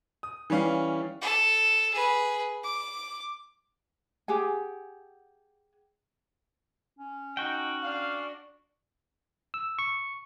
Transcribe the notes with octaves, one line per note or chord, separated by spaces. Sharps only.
D#6
E3 G3 C#4 F5
A4
G#4 B4
D6
G4 G#4 F#5 G#5
C#4
D#4 F#4 G5
D4 F5
E6
C#6